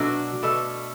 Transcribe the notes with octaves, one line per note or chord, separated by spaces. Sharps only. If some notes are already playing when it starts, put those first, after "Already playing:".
Already playing: B2 F#3 A3 D4 F#4
B2 A3